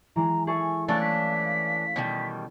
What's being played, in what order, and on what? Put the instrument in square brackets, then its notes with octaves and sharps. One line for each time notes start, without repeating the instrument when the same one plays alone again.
[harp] E3 G#3 [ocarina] A#5
[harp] G#4 A4 E5 [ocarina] C#6
[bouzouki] E3 D4 [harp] A3 C#4 [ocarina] F5 [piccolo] A6
[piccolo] B6
[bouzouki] B2 D#3 G3